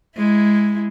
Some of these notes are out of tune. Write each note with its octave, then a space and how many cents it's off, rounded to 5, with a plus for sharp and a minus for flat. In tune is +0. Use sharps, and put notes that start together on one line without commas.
G#3 +0 E4 +0